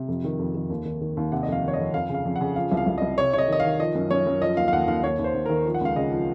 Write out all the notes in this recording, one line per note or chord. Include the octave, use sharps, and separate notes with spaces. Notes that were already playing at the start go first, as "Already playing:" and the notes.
Already playing: C3
F2
D#3
F2
D#3
D#2
D#3
D#3
D#2
C3 F#5
D#5
F2 F5
D#3 C#5
D#5
F2
F2 F5
C#3
F5
F2
F#5
C#3
F3 F5
C2
F5
C2
C2 D#5
C3 C#5
C3 C#5 D#5
D#3 D#5
D#3 F5
F3 D#5
F#2
F#2 C#5
F#2
F3 D#5
D#2 F5
F5
D#2 F#5
D#2 F5
D#2 C#5
D#2
C5
D#2
D#3 A#4
F3
F#5
C#2 F5
C#3 D#5
F3